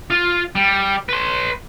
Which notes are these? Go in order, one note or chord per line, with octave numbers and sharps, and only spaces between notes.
F4
G3
B4 C6